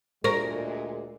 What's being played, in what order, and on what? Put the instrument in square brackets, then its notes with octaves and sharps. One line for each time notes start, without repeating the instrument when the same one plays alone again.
[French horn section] D2 A#2 G#3 [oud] A#4 [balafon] C5 C#6